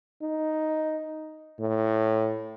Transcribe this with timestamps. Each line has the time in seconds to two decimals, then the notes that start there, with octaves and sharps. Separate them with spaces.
0.22 D#4
1.60 A2